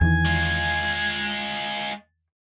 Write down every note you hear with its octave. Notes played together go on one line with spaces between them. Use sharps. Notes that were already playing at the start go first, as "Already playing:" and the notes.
E2 D#3 E3 G#5
G#3 F4